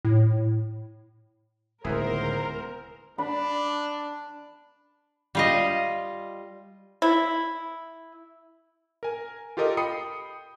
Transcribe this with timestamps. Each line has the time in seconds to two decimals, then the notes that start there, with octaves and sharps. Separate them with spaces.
0.05 A2
1.85 D1 C#2 D#3 B3 E4 G#4 A#4 C5
3.18 D4 B5
5.35 G3 F4 D#5
7.02 E4
9.03 A#4 G#5
9.57 F4 G4 A4 A#4 D#5
9.77 G5 B5 D#6 C7 C#7